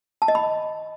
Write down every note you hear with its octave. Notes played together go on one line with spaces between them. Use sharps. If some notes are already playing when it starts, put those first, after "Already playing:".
A5
D#5
B5